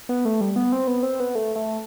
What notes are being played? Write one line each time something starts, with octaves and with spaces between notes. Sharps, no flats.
B3
A3
G3
B3
C4
B3
C4
B3
A3
A3